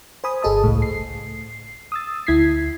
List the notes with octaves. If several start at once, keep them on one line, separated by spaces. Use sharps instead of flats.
C5 G#5 B5 D#6
G1 G#4 A4 D#5 A5 D#6
C#2 A2
C7
D#6 E6 A6
D2 E4 G#6 B6 C7